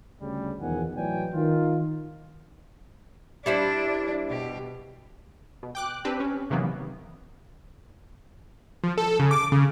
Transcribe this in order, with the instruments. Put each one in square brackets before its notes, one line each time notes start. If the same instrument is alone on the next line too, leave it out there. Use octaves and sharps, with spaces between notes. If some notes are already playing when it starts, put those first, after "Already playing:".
[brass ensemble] D2 C#3 G3
E2 B2 D#3 F3 F#5 G#5
A2 E3 F#3 D5 G5 G#5
D#3 F4
[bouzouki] G3 E4 C5 [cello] D4
[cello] B2 G4
[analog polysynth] B2
G5 D6 F#6
C4 D4 G4 B4
C#4
C3 D#3 E3 F#3 A#3 B3
F3
A4
C#3
D6
C#3